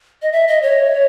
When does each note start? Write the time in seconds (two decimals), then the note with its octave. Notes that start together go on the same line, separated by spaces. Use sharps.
0.22 D#5
0.32 E5
0.48 D#5
0.62 C#5